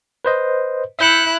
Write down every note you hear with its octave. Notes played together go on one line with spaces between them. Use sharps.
B4 C5 D#5
E4 E5 F#6 G6 C#7